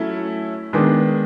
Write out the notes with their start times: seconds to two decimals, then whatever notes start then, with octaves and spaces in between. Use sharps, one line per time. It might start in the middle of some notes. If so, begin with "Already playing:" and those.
Already playing: F#3 A3 C#4 E4
0.73 D#3 G#3 B3 D4